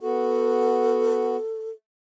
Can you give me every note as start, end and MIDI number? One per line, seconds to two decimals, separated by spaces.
0.01 1.37 59
0.01 1.37 66
0.01 1.70 69